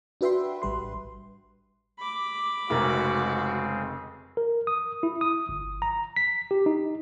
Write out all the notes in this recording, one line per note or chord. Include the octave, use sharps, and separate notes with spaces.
D4 F#4 B4 E5 G5 C6
A1 G3 B4 C6
B5 D6
F1 C#3 G#3 C4 F#4 A#4
A#4
D#6
E4
D#6
G1
A#5
B6
G4
D#4